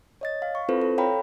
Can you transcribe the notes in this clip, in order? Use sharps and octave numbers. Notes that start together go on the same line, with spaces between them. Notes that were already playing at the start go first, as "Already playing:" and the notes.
C#5 D#5 A6
F5
C#6
C4 E4 F4 A4 B4 C5
A4
C#5 F5 G5 A#5 B5